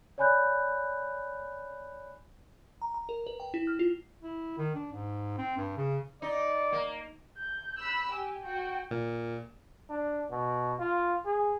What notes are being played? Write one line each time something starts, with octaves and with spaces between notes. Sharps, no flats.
C#5 D5 G#5 B5 F#6 G6
A#5
A#5
A#4
B4
G5
E4
F6
F4
E4
D#3
D4
G#2
C4
G2
C#3
D#4 D5
A#3
G6
B5 E6 F#6
G4 G#5
F#4 G5
A#2
D4
B2
F4
G#4